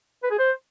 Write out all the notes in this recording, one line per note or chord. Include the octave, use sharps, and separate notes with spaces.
B4
G#4
C5